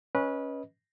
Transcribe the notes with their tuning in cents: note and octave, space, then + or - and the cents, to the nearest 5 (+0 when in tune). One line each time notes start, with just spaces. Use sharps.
C#4 +0 B4 -20 D#5 +15